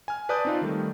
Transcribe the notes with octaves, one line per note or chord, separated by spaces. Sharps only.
G#5 F6
B4 D5 A5 D#6 F#6 G6
C4 D#4 F4
D#3 G3 A3